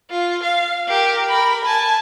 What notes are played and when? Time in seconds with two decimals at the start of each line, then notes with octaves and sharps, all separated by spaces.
0.11 F4
0.43 F5
0.88 G4 A#4
1.28 A#4 B5
1.65 G#5 A5